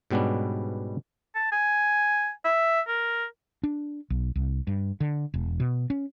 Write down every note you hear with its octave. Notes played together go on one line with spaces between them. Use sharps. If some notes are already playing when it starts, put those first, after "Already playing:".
G#2 B2 G3 B3 C#4 D4
A5
G#5
E5
A#4
D4
B1
C2
G2
D3
E1
B2
C#4